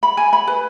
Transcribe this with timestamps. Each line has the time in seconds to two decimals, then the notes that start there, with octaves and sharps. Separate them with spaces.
0.03 B5
0.17 G#5
0.33 B5
0.47 B4